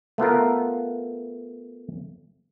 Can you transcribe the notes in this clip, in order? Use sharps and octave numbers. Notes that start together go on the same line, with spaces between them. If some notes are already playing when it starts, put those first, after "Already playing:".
A3 B3 F4 A#4